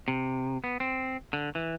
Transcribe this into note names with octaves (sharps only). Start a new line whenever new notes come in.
C3
B3
C4
D3
E3